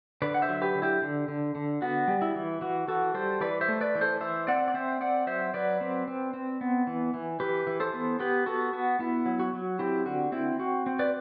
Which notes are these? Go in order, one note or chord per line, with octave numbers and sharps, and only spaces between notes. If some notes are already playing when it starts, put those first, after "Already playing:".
D3 B4 D5
F#5
C5 E5
F#3
G4 B4
D3
E4 G4
D3
D3
D3
B3 F#4
G3
E4
E3
E3 F#4
E3 F#4 A4
G3 A4 C5
E3 B4 D5
C5 E5
A3
B4 D5
E3
A4 C5
E3 C5 E5
C4 D5 F#5
D5
C4 C5 E5
C4 D5 F#5
F#3 C5 E5
F#3 B4 D5
C4
C4
C4
B3
E3
E3
E3 G4 B4
E3
A4 C5
B3
B3 G4 B4
B3 F#4 A4
B3 F#4
B3 E4
F#3
F#4
F#3
C4 E4 G4
D3 F#4
C4 E4
C4 F#4
C4
B4 D5